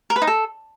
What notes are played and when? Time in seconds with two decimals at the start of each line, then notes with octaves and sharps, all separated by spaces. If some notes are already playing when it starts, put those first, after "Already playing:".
0.10 A#4
0.16 B4
0.22 D#4
0.27 A4